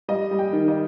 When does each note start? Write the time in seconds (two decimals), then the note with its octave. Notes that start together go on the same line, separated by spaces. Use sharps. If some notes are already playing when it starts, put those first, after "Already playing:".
0.08 G3 D#5
0.31 G3
0.39 G5
0.53 D#3
0.68 D#5